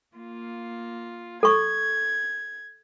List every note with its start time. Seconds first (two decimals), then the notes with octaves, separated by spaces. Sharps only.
0.17 A#3 F4
1.43 A4 C#6 G#6